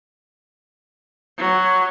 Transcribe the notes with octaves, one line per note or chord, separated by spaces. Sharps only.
F#3